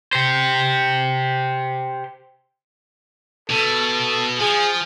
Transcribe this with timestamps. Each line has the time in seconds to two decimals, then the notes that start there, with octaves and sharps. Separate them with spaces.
0.13 G4 C5
3.50 B2 A4
4.40 F3 G#4